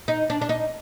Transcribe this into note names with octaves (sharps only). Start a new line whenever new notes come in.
D#4
D4
D4
D#4